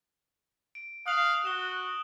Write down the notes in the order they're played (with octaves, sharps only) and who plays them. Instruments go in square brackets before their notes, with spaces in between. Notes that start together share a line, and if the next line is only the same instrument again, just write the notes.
[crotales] D7
[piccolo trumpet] F5 [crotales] D#6 F#6 F#7
[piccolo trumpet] F#4 [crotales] E7 G7